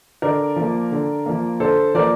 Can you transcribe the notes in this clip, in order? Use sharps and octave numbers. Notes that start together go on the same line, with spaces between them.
D3 A#4 D5
F3 A#3
D3
F3 A#3
D3 A4 C5
F3 A#3 A#4 D5